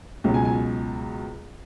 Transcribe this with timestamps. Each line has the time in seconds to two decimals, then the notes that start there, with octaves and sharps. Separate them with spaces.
0.24 C#2 B2 F#3
0.34 G#5
0.45 G#5